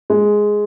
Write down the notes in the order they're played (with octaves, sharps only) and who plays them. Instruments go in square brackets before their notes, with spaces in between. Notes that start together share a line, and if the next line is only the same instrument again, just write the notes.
[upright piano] G#3